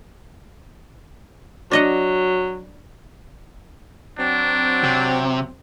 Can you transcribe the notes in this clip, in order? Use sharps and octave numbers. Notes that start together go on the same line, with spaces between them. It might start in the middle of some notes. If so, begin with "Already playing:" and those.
F#3 D4 D#5 F#5
F#3 C4 D4
C3